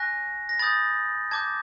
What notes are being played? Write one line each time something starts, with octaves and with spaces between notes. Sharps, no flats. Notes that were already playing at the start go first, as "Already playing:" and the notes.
Already playing: G#5 C#6 F#6 A#6
A#6
B5 D#6 G6 A6
A5 D6 G6 G#6